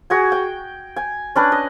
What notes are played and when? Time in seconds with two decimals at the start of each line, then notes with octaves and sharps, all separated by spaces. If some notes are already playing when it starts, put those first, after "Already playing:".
0.10 F#4 G#4 G#5
0.32 G5
0.96 G#5
1.36 C#4 D4 B4
1.52 D#5